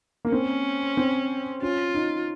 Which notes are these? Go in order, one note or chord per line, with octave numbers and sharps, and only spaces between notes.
A#3
C4 C#4
C4
C#4 F4
D#4